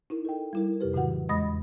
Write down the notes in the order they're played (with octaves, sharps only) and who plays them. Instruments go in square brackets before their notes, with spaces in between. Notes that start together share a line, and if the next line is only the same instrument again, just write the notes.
[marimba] D#4 E4 A#4
A4 D#5 G5
G3 E4 A#4
F2 C3 G4 B4
A2 C#3 E3 F#3 F#4 F#5
E2 G#3 D#5 B5 D#6 A#6